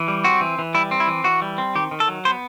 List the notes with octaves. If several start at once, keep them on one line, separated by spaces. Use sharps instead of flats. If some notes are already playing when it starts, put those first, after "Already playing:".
Already playing: E3
G3
C4 F#4
E3
E3
G3 E4
C4
E4
E3
E3 F#4
G3
C4
D#3 G4
D#3
A4
F#3
B3 C5